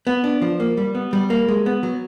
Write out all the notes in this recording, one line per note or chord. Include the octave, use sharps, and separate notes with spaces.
B3
D4
F3
A#3
G3
B3
G3
A#3
G#3
B3
F#3